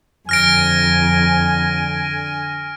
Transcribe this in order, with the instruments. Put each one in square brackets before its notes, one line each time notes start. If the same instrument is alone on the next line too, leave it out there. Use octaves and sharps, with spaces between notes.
[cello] F2 [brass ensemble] D3 G#5 [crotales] F6 A#6 D7